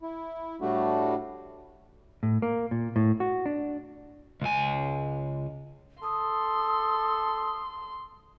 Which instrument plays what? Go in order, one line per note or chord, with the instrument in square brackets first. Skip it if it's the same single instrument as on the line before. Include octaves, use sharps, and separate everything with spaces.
[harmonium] E4
A2 G3 A3 D4 F#4
[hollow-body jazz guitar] A2
A#3
A#2
A2
F#4
D4
[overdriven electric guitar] C#2 G#5
[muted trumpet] A4 [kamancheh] C6 [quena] D#6